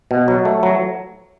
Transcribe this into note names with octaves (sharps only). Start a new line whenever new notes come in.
B2
F#3
A3
F#3